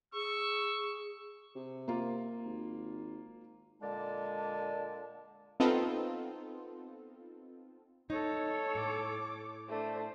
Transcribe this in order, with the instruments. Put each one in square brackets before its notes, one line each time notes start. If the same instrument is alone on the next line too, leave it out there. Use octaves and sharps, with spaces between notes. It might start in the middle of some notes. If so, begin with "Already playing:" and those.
[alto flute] G#4 [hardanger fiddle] C#6 [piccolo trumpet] E6
[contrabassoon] C3
[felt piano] A#3 F4
[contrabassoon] G#1
[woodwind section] A#2 D3 G#3 D5 A5
[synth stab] B3 C4 D#4 F4 A4
[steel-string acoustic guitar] D#4 [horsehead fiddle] A4 C#5
[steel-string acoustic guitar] A2 [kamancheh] D6
[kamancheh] A3 D4 [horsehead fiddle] C5 D5